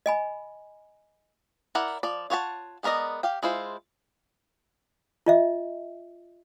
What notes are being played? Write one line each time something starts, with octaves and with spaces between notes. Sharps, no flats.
D#5 G#5 B5
E4 A#4 D5 F#5
F3 D5
F4 C#5 F#5 A5
G#3 B3 A#4 D5 D#5
G4 F5 G5
G#3 E4 F4 C5
F4 D#5 E5